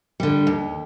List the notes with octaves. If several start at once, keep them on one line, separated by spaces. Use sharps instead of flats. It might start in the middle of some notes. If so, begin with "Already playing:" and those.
D3 G3
D#2